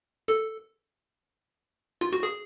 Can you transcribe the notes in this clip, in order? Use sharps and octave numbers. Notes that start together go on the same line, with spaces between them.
A4
F4
F#4
G#4